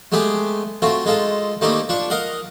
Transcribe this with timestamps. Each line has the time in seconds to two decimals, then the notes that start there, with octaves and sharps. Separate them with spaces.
0.12 G#3 A3 B3 G4 G#4
0.82 A3 C4 F4 F#4
1.06 G#3 D#4 F4 A4
1.61 D#3 G3 A3 A#3 C4 D#4
1.89 F3 D4 C#6
2.10 A#4 D#5 F5 F#5